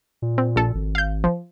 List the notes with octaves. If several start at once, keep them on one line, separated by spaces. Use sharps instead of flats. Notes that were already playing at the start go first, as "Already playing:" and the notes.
A#2
C4
A#1 A4
G#1
F5 G6
F3